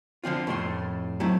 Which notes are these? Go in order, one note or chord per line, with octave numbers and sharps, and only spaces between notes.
D3 F3 C4 F4
F2 A2 A3 E4 C6
F#3 A3 C4 E4